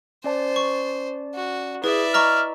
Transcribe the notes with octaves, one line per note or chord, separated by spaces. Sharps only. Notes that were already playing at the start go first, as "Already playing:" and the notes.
C#4 C5 D5 A5
C#6
F#4
E4 G#4 B4 D5 E5
D#5 A#5 C#6 F6